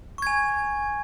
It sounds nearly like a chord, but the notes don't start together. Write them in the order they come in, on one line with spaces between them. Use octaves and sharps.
C#6 G#6 G#5